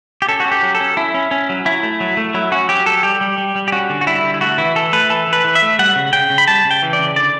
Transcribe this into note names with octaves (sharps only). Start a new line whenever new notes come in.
G4
C#4 A4
F#4
C#4
G4
F#3
A4
C#4
C#4 E4
C#4
C#4
F#3
F#3 E4
A3
F#3
A3
F#3 E4
C#4 F#4
F#3 G4
F#3 A4
G3 G4
G3
G3
G3
G4
C#4 F#4
D3
F#4
G3 E4
D3
E4
A3 F#4
E3 E4
E3 A4
A3 B4
E3 A4
E3
B4
E3
E5
A3
G3 F#5
C#3
C#3 G5
C#3
B5
G3 A5
C#3
G5
E3
D5
C#3
D3 D5